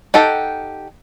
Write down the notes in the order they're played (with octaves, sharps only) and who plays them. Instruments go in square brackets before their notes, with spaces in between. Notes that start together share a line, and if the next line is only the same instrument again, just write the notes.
[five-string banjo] D#4 G4 A4 F#5 G5